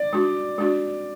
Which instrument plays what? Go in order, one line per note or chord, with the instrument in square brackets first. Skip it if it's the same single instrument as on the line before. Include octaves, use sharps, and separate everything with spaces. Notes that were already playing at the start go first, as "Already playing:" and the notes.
Already playing: [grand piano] D5
[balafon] G#3 D4 F#4
G#3 D4 F#4